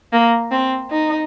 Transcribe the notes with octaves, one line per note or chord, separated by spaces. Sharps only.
A#3
C4
D#4